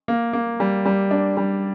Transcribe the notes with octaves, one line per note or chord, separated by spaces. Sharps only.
A#3
A#3
G3
G3
D4
G3